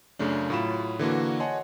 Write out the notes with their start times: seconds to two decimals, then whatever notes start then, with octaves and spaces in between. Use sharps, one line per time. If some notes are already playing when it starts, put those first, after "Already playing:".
0.19 F#2 C#3 A3 D4
0.50 A2 F#3 F4 B5 E7
0.99 D3 E3 A#3 F#4
1.40 C#5 D#5 F#5 G#5 A5 C6